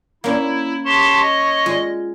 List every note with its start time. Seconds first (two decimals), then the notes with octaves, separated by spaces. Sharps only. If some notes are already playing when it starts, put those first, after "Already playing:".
0.24 A#3 C#4 E4
0.86 G4 C#5 A5 C6
1.20 D#5
1.66 G#3 F4